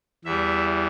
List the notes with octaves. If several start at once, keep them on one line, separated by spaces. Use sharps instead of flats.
E2 E3 G3 E5